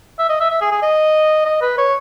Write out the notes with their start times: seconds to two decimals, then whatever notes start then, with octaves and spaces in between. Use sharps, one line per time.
0.19 E5
0.29 D#5
0.40 E5
0.50 E5
0.61 G#4
0.72 G#4
0.82 D#5
1.46 D#5
1.61 B4
1.78 C#5